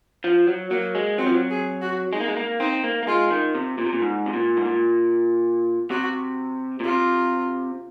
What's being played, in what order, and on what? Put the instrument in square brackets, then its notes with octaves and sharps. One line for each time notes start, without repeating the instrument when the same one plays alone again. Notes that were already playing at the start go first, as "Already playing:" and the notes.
[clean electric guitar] F3
F#3
[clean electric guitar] F#3 [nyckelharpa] A#3
[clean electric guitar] G#3
[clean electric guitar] F#3 [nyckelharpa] C4
[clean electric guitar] F3
F#3
[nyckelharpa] G#4
F#4
[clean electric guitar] G#3 [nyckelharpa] D#4
[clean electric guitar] A#3
G#3
A#3
[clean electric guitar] C4 [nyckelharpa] D#4
[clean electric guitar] A#3
A#3
[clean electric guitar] G#3 [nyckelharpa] F4
[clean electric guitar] D#3
C3
A#2
C3
A#2
G#2
C3
A#2
G#2
A#2
[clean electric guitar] C3 [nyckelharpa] F#4
[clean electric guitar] A#2
[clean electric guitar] C3 [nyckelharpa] F4